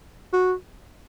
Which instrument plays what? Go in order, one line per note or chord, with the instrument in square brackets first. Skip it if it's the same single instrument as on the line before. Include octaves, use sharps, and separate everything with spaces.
[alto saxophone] F#4